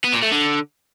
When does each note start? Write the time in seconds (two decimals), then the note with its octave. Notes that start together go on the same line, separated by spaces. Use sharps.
0.04 B3
0.13 A#2
0.22 A3
0.31 D3